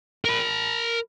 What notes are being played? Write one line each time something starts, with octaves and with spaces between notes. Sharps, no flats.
A#4 B5